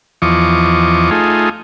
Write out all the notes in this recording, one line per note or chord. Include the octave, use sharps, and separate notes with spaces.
E2 F3 D#5 C#6 D6
A3 D#4 F4 G#4